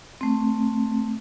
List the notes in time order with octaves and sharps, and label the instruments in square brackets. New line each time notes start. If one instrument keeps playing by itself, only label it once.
[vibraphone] A3 C4